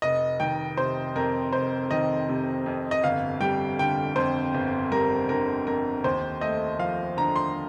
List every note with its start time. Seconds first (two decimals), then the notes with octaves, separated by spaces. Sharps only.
0.02 F1 D#5
0.40 D#3 G5
0.77 C3 C5
1.15 F2 A#4
1.53 F1 C5
1.91 D#3 D#5
2.29 C3
2.66 F2
2.91 D#5
3.03 G1 F5
3.41 G3 G5
3.79 D3 G5
4.16 F2 C5
4.55 G1
4.91 G3 A#4
5.29 D3 A#4
5.67 F2 A#4
6.04 D#2 C5
6.41 A3 D#5
6.79 F3 F5
7.17 D3 A#5
7.36 C6